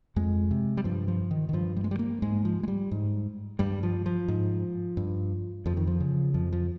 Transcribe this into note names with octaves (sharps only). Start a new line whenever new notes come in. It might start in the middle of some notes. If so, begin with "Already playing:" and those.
F2 G#3
C3
G3
G2 F3
F3
D#3
D#3
G2 F3
G3
G#3
G3
A#3
G#2 G#3
F3
G#3
G3
G#2
G2 G3
F3
F3
G#2
G2
F2 F3
D#3
F3
C#3
F2 F3
F3